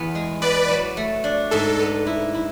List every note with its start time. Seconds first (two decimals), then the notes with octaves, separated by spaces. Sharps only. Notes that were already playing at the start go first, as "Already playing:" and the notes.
Already playing: E2 B3
0.15 G#3
0.42 B3 B4 D5
0.69 F#3
0.97 A3
1.24 D4
1.51 G#2 A4
1.79 B3
2.07 E4
2.34 E4